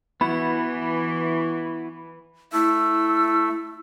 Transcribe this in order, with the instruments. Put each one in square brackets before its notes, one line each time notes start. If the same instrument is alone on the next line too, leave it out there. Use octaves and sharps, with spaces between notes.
[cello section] E3 [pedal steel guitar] B3 E4 F#4 [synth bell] B5
[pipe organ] A3 [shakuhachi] E4 [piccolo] E6